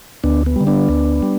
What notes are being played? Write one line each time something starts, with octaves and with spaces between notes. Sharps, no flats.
D2 B3 D4
B3
D3 G3
B3 D4
D2
G3